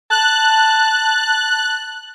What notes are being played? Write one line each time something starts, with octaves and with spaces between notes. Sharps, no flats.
A5 F#6